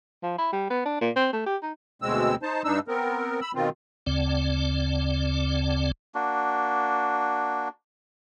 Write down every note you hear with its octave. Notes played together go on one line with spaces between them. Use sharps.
F3
E4
G3
B3
D4
A#2
C4
A3
G4
D#4
D2 B2 G#3 C4 E6
D#4 C5 A5
G2 D4 D#4 E6
B3 C4 A#4
B5 E6
B2 D#3 C4 F4
D2 C#3 C4 D5
A#3 D4 F#4